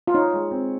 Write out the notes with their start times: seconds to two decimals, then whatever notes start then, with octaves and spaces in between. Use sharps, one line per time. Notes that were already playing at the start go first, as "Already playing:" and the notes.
0.07 F4
0.14 D#4 C#5
0.33 G#3
0.51 C4